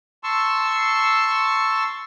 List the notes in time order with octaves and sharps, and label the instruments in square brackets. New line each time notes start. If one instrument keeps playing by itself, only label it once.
[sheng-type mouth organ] A5 C6 C#6 E6